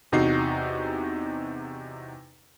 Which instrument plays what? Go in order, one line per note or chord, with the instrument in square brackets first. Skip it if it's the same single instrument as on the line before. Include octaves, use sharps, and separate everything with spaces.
[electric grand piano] E2 C3 D#4 F#4 C7